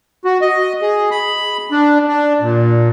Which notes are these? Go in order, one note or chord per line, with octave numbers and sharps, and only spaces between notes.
F#4
D#5
G#4
B5
D4
D4
A#2